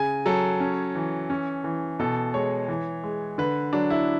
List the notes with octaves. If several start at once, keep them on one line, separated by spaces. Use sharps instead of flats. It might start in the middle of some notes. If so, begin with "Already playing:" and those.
Already playing: C#3 G#5
F#3 A4
C#4
E3
C#4
E3
B2 A4
G#3 C#5
E3
G#3
D3 B4
F#3 D4
E4